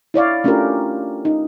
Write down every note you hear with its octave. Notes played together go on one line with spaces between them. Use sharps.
E4 C#5 D5 F5
A3 C#4 D4 F4 G4 A#4
D#4